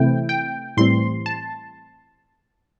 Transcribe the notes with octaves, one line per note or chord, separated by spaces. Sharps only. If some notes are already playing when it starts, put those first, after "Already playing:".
Already playing: C3 E3 A3 C4 E4 G5
G5
A2 E3 G3 C4 C6
A5